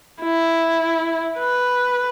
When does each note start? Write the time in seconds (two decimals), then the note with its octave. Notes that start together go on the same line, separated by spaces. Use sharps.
0.23 E4
1.39 B4